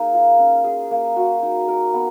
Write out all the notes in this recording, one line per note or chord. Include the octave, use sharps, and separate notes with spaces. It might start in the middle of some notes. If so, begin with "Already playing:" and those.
Already playing: A#3 D#4 G#4
F4
C#4
G#4
A#3
F#4
D#4
A#4
B3